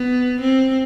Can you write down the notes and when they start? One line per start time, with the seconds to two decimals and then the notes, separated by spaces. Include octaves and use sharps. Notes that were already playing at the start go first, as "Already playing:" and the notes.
Already playing: B3
0.41 C4